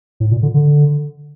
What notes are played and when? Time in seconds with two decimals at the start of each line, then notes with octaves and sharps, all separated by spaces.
0.20 A2
0.31 A#2
0.43 D3
0.54 D3